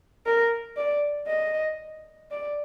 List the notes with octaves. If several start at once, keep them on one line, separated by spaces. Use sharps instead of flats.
A#4
D5
D#5
D5